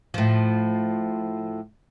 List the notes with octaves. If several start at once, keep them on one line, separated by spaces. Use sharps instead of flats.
A2 F3